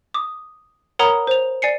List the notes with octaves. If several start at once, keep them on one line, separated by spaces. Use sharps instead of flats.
D6 D#6
A#4 C#5 F#5 A#5 B5 D#6
C5 F7
D5 G#5 C7 C#7